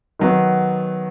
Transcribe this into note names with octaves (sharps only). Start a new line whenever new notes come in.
D#3 F#3 B3